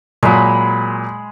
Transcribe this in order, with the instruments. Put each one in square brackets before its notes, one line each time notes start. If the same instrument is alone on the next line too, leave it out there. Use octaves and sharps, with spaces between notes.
[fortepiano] A#2 F#3 [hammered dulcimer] G#3 B5